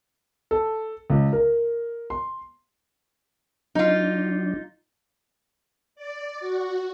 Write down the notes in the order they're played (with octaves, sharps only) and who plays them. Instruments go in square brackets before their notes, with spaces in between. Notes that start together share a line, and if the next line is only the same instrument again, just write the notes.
[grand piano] A4
C#2
A#4
C6
[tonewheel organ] F#3 D4 [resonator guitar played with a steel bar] D#4 F4
[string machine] D5
F#4